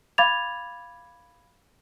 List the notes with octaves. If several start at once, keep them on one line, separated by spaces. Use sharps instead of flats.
F5 B5 D6 G#6 A6 F7